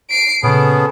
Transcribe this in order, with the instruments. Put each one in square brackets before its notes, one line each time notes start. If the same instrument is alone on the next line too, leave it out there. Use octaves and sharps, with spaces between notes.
[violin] C7 D7
[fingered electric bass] A#2 C#3 [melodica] B3 C#4 G#4 [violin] A4